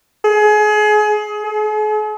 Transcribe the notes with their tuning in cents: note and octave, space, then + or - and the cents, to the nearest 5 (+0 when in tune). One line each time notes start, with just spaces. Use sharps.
G#4 +30
G#4 +45